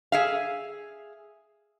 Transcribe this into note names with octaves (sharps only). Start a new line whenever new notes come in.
G#4 E5 F5